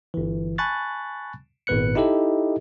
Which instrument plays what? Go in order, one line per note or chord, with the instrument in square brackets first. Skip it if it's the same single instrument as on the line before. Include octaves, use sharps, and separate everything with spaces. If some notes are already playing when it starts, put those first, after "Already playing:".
[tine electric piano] G1 E3
G#5 A5 B5 C#6 F#6 A6
G#1 A#2 B3 B4 F#6 C#7
D#4 E4 G4 A4 D#5